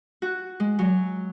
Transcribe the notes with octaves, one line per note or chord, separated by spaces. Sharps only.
F#4
G#3
F#3